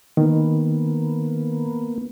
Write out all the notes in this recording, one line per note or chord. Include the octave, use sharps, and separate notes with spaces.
D#3 A#3 B3